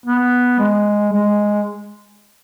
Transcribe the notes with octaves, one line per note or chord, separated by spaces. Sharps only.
B3
G#3
G#3